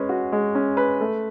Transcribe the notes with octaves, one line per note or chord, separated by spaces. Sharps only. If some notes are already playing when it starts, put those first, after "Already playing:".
Already playing: G#3 C#4 B4
F#4
G#3
C#4
B4
A3